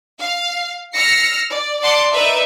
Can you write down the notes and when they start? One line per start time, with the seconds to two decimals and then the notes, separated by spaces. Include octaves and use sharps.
0.18 F5
0.94 E6 F6 A#6 C7 C#7
1.49 D5
1.81 D5 F#5 A5 C6 D6
2.11 D#4 A#4 B4 D5 E5